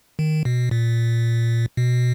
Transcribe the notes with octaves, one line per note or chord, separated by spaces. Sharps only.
D#3
B2
A#2
B2